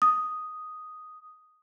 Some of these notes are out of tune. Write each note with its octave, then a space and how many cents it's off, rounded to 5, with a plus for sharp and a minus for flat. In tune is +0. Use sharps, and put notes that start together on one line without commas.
D#6 +0